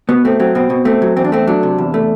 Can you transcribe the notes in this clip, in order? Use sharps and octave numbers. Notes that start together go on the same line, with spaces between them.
B2 B3
A3 C4
F#3 C4
B2 C4
B2
A3 C4
F#3
E2 C4
D4
A3 C4
F#3 D4
C3
E2
A3